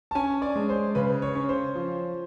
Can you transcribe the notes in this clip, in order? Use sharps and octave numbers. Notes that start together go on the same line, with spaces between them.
A5
C#4 G#5
D5
G#3
C5
C#3 B4
C#5
C#4
C5
F3